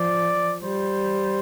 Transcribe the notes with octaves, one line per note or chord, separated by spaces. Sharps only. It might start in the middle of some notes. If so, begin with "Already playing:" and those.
Already playing: F3 D5
G3 C5